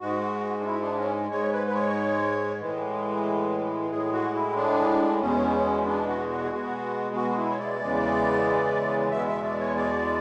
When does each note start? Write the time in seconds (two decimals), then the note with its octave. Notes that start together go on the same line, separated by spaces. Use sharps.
0.01 G#2 G#3 F#4
0.60 D4
0.66 E4
0.81 D4
0.98 C#4
1.31 G#2 G#3 C#5
1.53 B4
1.67 B4
1.74 C#5
2.61 A2 E3 G#3
3.91 A2 G#3 G#4
4.13 F#4
4.34 E4
4.56 D4
5.21 E2 B2 G#3 C#4
5.86 D4
6.08 F#4
6.29 F#4
6.44 G#4
6.51 B2 G#3 F#4
7.15 F#4
7.31 F#4
7.37 E4
7.50 C#5
7.59 D5
7.81 E2 C#3 E3 G#3
9.11 E2 B2 G#3 E5
9.27 E5
9.44 D5
9.59 C#5
9.76 D5